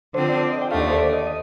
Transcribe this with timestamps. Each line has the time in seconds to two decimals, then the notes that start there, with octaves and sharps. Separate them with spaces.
0.14 D3 F3 C4 C5
0.29 D5
0.43 D5
0.52 D#5
0.62 G5
0.71 D#2 D3 A3 F5
0.81 D5
0.90 C5
0.99 D5
1.13 D#5
1.27 D#5